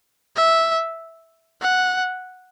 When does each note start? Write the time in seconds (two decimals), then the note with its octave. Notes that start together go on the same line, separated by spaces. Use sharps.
0.36 E5
1.61 F#5